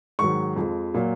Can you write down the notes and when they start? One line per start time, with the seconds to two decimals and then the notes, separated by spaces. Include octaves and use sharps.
0.19 G#2 D#3 F#3 C#6
0.56 F2 F3 G#3
0.94 A#2 F#3 A#3